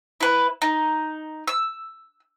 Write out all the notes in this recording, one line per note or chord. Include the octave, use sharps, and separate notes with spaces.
E4 B4
D#4
E6